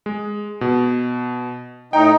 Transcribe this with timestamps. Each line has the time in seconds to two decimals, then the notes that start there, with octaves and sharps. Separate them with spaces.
0.06 G#3
0.61 B2
1.93 A2 D#4 G5